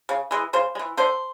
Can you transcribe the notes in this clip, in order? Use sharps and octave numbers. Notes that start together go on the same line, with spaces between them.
C#3
E3 G#3
C#3 C5
G#3
E3
D3 C5